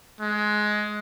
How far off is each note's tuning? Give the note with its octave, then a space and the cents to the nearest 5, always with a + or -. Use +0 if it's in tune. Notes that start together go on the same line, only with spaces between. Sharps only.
G#3 +15